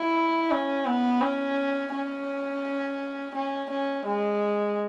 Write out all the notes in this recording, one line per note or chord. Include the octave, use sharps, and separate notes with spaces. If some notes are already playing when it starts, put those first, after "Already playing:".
Already playing: E4
C#4
B3
C#4
C#4
C#4
C#4
G#3